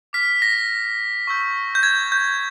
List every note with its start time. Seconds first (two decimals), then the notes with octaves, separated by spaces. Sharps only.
0.13 D6 F6 B6
0.42 A#6
1.27 C#6 E6 G6
1.75 G6
1.83 G#6
2.12 G6